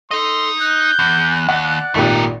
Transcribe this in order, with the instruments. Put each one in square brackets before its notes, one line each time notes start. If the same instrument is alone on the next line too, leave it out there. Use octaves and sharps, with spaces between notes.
[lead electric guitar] D#4 D#5 [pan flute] A4 [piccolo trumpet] C6
[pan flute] F#6 [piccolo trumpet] G6
[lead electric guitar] E2
[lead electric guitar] D#2 [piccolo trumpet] D5 [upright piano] F#5
[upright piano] G#1 A#2 G4 [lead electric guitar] A3 D#4